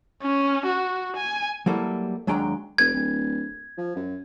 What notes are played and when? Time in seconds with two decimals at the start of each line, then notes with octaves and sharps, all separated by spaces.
0.22 C#4
0.66 F#4
1.17 G#5
1.66 F#3 G3 A#3 E4 A4
2.27 D#2 F#3 G#3 D4 G5 A#5
2.78 F1 G#6
2.94 D1
3.78 F3
3.96 F#2